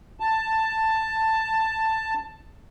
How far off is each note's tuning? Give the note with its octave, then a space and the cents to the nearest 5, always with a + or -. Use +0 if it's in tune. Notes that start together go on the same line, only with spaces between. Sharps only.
A5 +10